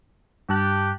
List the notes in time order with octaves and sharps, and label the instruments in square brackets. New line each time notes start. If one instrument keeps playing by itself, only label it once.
[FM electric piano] G2 A5 F#6 [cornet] G4